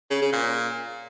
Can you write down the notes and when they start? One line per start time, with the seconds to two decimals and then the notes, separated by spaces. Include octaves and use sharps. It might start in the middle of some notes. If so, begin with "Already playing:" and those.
0.11 C#3
0.22 C#3
0.33 A#2